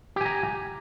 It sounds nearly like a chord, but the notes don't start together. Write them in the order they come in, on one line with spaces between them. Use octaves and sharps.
G4 G#5 A#5